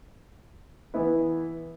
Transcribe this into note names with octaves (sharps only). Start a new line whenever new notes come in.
E3 B3 E4 B4